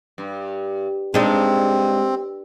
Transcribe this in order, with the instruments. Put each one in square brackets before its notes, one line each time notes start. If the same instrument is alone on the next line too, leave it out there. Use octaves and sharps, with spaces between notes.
[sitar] G2
[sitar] G2 [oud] G#3 D4 D#4 [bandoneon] C4